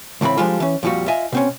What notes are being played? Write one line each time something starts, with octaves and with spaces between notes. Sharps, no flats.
C#2 A2 E3 C4 B5
F3 G3 G#3 D4 F4 A4
E3 C#4
F2 A#2 F3 G3 F#4
F4 D#5 E5 G#5
B2 C4 C#4